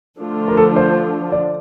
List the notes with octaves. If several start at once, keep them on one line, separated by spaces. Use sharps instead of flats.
D3 F3 A3 D4 F4
A#4
A4
C5
D5